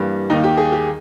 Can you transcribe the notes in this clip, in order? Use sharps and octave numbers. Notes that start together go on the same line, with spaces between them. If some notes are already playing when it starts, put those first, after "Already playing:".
Already playing: G2 E3 G3 A#3
D#2 D#3 A#3 D#4
G4
G#4
G4